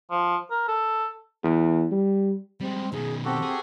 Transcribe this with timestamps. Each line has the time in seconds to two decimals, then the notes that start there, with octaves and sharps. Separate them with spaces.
0.11 F3
0.51 A#4
0.68 A4
1.44 E2
1.91 G3
2.60 G3 G#3 C4
2.93 B2 D#3 G#4
3.25 C4 F#4 G4 A4
3.42 G#4